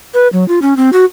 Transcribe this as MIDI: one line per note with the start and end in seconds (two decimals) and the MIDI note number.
0.14 0.28 71
0.33 0.47 54
0.48 0.59 65
0.62 0.77 61
0.77 0.90 60
0.93 1.05 66